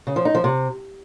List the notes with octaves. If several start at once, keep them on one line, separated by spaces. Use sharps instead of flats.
C#3
F3
D#4
F3
C3